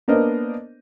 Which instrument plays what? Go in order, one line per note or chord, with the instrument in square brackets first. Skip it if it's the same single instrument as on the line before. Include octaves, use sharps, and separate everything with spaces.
[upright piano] A#3 B3 D4 A#4 C5 D#5